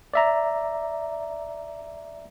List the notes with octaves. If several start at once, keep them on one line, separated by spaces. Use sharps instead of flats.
D5 E5 A#5